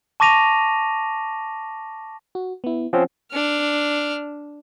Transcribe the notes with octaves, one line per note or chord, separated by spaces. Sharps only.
A5 C#6 D6 A#6 D#7 F7
F#4
B3 E4
F3 C4 C#4 F#5
D4 F6